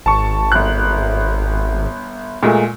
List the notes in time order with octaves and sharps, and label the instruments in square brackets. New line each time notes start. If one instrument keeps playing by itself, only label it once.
[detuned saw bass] G#1 [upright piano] A5 C#6
[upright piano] G1 F#6
A#2 G#3 A3